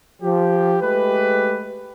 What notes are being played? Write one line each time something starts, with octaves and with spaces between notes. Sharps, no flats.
F3 G4
G#3 A3 G4 B4